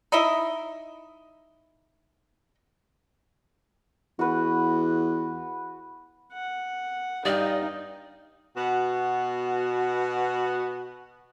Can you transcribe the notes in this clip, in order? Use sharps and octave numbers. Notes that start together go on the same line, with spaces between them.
D#4 E4 D#5 E5
E2 F#4 B4
F#5
G2 D#4 D5 D#5 F5 G5
B2 B3 F#4